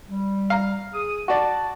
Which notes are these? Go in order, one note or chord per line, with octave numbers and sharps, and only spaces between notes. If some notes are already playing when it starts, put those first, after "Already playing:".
G3
F5 A#5
G#4 D#6
F#4 D5 A5